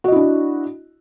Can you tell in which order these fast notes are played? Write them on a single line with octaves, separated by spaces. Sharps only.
F#4 D#5 E4 D4